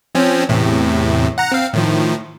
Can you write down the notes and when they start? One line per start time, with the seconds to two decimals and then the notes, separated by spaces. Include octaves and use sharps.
0.15 F3 C4 C#4
0.49 E2 A2 C3
1.38 F#5 A#5
1.52 C4 F5
1.73 A2 D#3 F3